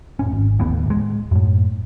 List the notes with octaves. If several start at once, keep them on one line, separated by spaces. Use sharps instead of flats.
F1 A2 C#4
G#1
D1 D#2 A2 B3
D1 G#3
F#2 A2